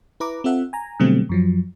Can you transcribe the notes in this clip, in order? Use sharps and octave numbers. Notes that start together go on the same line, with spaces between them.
E4 B4 A#5 D6
C4 F4 A4 E5 F#5
G#5 A#5
B2 D3 F#3 G3 A3 C4
F#2 F3 F#3